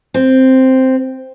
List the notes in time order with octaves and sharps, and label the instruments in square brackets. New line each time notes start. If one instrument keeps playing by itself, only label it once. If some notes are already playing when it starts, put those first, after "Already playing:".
[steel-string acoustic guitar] C4